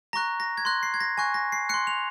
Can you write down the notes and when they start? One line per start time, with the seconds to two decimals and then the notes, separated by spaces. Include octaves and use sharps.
0.13 A#5 C#6 F#6 A#6
0.40 A#6
0.58 G#6
0.65 C6 F#6 A#6
0.83 C7
0.94 G#6
1.00 A#6
1.18 G#5 C#6 F#6 A#6
1.34 A#6
1.52 C7
1.69 C6 F#6 C#7
1.87 F7